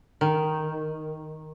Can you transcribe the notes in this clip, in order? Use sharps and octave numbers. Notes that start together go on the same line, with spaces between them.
D#3